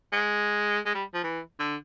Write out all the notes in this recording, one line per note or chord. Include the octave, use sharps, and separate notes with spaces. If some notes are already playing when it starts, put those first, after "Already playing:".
G#3
G#3
G3
F3
E3
D3